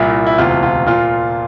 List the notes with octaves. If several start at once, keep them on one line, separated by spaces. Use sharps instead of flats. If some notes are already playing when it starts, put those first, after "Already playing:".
Already playing: C2 A#2 E4
E4
E1 D2 C3 F4
F4
A#2 F4